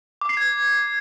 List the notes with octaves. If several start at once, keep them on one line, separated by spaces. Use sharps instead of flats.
D6
C7
G#6